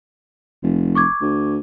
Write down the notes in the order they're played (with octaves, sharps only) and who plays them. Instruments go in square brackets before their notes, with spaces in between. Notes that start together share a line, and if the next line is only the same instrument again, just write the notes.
[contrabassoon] F1
[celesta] C#6 D6 G#6
[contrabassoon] D2